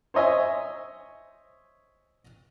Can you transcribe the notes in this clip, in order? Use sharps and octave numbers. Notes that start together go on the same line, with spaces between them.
C5 C#5 D#5 E5 G#5